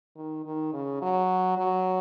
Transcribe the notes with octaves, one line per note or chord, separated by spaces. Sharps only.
D#3
D#3
C#3
F#3
F#3